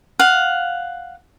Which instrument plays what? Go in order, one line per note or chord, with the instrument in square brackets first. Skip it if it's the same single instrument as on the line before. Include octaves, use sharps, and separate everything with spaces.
[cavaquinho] F5 F#5